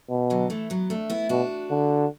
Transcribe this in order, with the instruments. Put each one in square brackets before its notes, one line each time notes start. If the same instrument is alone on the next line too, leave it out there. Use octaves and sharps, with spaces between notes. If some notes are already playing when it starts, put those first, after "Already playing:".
[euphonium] B2
[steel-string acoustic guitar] D3 F#3
E3 A3
F#3 B3
A3 D4
B3 E4
[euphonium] B2 [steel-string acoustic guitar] D4 F#4
[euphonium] D3